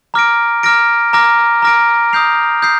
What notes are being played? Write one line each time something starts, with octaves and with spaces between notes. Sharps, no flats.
A#5 D6 F6 A#6 D7
A#5 D6 F6 A#6 D7
A#5 D6 F6 A#6 D7
A#5 D6 F6 A#6 D7
D#6 G6 C7 F7
D#6 G6 C7